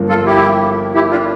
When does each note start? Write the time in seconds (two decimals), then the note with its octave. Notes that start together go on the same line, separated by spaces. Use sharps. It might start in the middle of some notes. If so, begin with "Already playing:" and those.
Already playing: G1 G2 D3 F3 A#3
0.09 F4 A4
0.26 E4 G4
0.95 E4 G4
1.11 D4 F4